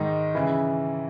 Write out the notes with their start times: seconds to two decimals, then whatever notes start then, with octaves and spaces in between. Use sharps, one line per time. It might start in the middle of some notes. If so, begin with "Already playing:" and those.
Already playing: G#2 D#3 D#4
0.35 C#3 E3 E4